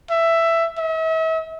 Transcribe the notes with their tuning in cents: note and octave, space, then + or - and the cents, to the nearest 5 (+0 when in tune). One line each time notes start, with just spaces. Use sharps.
E5 +10
E5 -40